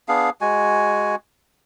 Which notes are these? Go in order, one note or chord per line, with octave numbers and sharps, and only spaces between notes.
B3 D4 G#4 F5
G#3 F#4 G#5